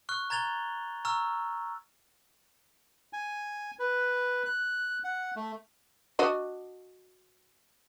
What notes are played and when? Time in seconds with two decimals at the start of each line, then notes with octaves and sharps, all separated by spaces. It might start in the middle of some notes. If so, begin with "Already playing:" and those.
0.09 C#6 F6 F#6
0.30 A#5 G#6 A6 F7 G7
1.05 A#5 C#6 E6 F6
3.13 G#5
3.79 B4
4.46 F#6
5.04 F#5
5.36 A3
6.19 D4 F#4 D#5